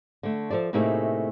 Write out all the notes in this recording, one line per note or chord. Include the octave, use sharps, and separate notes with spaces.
D3 A3
F3 A4 C5 D5
A2 C3 A3 A#3 D#4 G#4